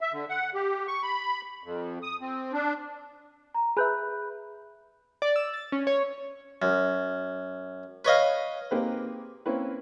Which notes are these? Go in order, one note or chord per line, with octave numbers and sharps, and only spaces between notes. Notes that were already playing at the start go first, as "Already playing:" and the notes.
E5
D3
F#5
G4
C#6
B5
F2
D#6
C4
D4
A#5
G#4 B4 E5 B5 F#6 G6
D5
E6
A6
C#4
C#5
F#2
B4 C#5 D#5 F5
A#3 C4 D#4 G4 G#4 B4
A#3 C4 C#4 E4 B4